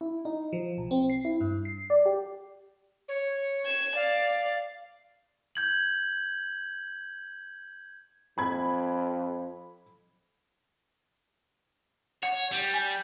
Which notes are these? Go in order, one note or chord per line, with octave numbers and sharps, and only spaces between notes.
E4
D#4
F3
B1
C4
C7
E4
G2
C7
D5
G4
C#5
G#6 E7
D5 F5
G6 G#6 F#7
F2 B5 G#6
C#5 F#5
G3
G#5